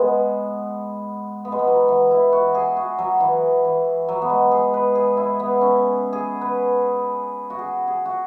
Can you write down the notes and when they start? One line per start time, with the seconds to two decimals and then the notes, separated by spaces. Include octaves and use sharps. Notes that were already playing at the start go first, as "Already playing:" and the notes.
Already playing: G#3 B3
1.45 B3
1.52 G#3
1.59 B3
1.67 F#3
1.89 E3
2.11 E4
2.32 F#4
2.55 G#4
2.77 F#4
2.99 F#3
3.20 E3
3.65 E3
4.09 F#3
4.22 B3
4.30 G#3
4.51 G#4
4.74 B4
4.95 G#4
5.17 E4
5.40 B3
5.61 C#4
6.13 G#4
6.41 B4
7.50 F#4
7.59 G#4
7.87 G#4
8.06 F#4